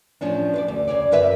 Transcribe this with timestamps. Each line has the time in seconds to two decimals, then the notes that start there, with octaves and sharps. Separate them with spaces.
0.21 A2 F3 C#4 D4
0.54 B4 C5 D5
0.68 D2
0.88 C#3 C#5 D5
1.11 F#2 A#4 B4 E5